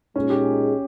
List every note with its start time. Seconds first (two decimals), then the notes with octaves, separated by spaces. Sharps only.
0.16 A#2 G#3 C#4 D#4 G#4
0.30 G4